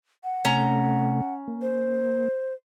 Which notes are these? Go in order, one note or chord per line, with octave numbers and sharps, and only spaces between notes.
F#5
C3 A3 C#4 A#5
A#3
C5